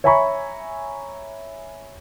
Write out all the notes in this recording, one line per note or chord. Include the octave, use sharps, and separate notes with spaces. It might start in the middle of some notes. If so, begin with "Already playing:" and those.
C#5 E5 G#5 A#5 B5 C#6